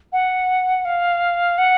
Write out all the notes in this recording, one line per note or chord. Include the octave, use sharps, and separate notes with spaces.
F#5
F5
F#5